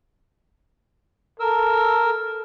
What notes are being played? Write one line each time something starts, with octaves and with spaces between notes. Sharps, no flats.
A4 A#4 E6